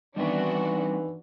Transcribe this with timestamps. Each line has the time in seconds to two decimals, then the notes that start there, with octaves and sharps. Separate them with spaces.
0.16 D#3 E3 G3 B3 C4 D4 F#4 E5